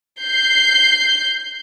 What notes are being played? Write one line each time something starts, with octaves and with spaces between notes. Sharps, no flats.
G6 C7